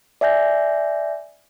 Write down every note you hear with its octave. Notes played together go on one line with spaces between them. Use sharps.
D5 E5 G#5 G6 A#6